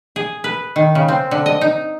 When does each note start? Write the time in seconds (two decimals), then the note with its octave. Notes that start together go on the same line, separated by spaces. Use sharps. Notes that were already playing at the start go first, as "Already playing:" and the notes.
0.16 G#4
0.44 B4
0.76 D#3
0.95 C#3
1.08 C4
1.31 D3
1.46 D#5
1.61 D#4